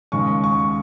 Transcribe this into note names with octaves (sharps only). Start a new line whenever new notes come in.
D#2 C#3 G#3 C#6
C#6